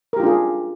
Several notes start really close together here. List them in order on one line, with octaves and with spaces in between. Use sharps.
A#4 G4 F4 D4 G#4